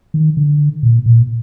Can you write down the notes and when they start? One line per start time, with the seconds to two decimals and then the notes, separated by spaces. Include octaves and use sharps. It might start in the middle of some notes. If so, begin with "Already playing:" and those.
0.14 D#3
0.37 D3
0.83 A#2
1.06 A#2